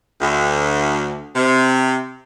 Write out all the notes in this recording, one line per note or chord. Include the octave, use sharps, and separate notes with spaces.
D2
C3